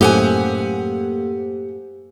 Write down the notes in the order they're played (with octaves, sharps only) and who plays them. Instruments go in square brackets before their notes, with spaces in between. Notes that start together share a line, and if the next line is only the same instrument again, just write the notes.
[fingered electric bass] F#2 A2 [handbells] A#3 A4 C5 [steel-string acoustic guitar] G4 F#5 G#5